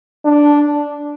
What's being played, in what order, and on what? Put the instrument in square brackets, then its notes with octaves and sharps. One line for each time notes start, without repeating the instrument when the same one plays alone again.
[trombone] D4